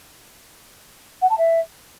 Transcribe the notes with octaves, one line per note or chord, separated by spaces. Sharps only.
F#5
A5
E5